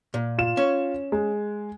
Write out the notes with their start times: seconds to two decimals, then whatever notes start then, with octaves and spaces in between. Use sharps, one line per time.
0.14 A#2
0.38 F4 E7
0.57 C#4 C#5
1.12 G#3